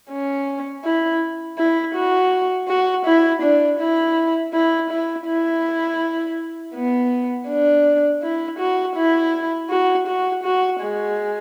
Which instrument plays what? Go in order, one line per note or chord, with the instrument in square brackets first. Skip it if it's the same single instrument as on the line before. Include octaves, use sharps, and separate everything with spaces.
[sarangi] C#4
E4
E4
F#4
F#4
E4
D4
E4
E4
E4
E4
B3
D4
E4
F#4
E4
F#4
F#4
F#4
G#3